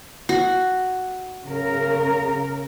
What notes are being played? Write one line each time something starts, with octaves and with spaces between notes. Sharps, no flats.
F#4
C#3 A#4